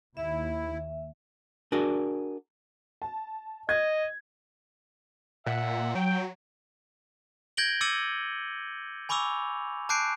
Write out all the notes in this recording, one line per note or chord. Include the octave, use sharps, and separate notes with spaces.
D#2 E4 E5
D4 F#4 G#4 A#4 D5
A5
D#5 G#6
A#2 E5 F#5
F#3 G5
G6 G#6 A#6 D7 F#7 G7
D6 E6 A6 C#7 D#7 F#7
G#5 B5 C#6 D6 E6 F7
A5 D6 F#6 G6 C7 D7